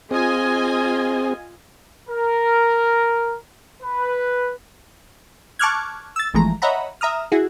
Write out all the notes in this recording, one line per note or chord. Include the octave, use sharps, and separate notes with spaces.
C4 F4 G#4 D#5 G#5
A#4
B4
A5 C#6 D6 F6 F#6 G#6
E6 A6
G#1 E3 F3 G#3 A3 A#5
C#5 D#5 E5 F#5 A#5 B5
E5 A#5 D#6 F6
E4 F#4 G#4